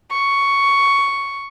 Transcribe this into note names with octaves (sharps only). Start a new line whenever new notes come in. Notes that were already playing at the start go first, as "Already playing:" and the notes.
C#6